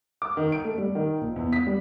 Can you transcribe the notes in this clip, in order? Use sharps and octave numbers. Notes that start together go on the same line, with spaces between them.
D6
D#3
D7
A3
G3
D#3
A#1
E2
B6
G3